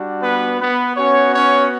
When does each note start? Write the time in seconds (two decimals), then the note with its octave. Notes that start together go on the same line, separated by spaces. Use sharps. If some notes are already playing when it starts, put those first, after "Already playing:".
Already playing: G3 D4 F#4
0.22 B3 B4
0.60 B3 B4
0.96 B3 C#4 F#4 C#5
1.35 C#4 C#5